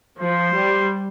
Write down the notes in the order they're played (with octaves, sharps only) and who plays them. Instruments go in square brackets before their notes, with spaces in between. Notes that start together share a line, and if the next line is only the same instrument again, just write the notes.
[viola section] F3 [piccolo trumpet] C5
[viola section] G3